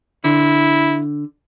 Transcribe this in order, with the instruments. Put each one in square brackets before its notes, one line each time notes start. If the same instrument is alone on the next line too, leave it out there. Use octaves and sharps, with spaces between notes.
[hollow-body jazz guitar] D3 [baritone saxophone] E4